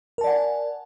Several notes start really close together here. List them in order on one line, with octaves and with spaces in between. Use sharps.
A#4 A5 D5 F#5 G#5